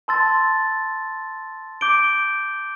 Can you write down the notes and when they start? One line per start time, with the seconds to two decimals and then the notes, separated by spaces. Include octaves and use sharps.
0.08 A5 C6 E6 A6
1.81 D6 G6 D7 G7